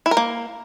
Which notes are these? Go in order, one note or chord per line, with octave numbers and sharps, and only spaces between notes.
E4
A#4
A#3